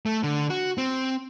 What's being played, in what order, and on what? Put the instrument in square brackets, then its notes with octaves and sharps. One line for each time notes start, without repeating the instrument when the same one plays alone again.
[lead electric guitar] A3
D3
F#4
C4